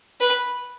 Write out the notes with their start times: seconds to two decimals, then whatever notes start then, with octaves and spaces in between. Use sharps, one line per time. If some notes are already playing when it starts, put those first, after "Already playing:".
0.20 B4